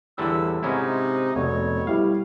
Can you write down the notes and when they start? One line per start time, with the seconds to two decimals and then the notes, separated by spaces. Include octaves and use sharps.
0.18 E2 A2 D3 G3 E6
0.63 G#2 C3 C#4 D#4 E4
1.35 F1 B2 C#5
1.87 G3 E4 F5